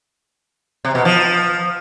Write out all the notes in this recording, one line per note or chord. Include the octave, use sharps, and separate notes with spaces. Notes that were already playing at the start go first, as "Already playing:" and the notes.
C3
B2
F3